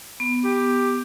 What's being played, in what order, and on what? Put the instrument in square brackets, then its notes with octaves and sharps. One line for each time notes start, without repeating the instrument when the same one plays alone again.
[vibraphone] B3
[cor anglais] G4